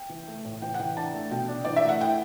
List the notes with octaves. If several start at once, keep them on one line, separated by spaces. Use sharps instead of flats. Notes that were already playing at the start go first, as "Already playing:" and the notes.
Already playing: G5
E3
A3
A2
E3 G5
F#5
E3 G5
D4 A5
A3
B2 G5
D4
E3 D5
E5
A3 F#5
E4 G5